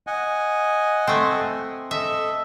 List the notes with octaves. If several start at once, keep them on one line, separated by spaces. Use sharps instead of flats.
D#5 F#5 G#5
A3 C4
A4 D#5 E5